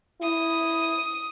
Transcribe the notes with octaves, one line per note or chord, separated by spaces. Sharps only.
E4 D#6